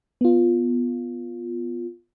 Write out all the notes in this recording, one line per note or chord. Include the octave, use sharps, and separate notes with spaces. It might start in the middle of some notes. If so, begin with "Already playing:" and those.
B3 F4